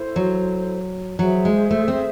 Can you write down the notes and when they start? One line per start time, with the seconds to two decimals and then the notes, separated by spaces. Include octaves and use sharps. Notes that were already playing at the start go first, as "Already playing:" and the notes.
Already playing: E4 A4 C5
0.16 F#3
1.19 F#3 G#4 C5 E5
1.45 G#3
1.71 A3
1.88 C4